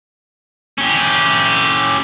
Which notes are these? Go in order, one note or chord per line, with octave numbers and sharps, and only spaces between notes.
C#4 G4